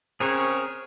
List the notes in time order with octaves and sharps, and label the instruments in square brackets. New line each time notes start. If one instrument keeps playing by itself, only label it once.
[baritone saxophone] C#3 [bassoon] C4 [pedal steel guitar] G#4 A#4 C#5